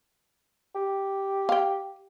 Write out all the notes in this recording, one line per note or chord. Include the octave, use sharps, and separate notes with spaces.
G4
F5 G5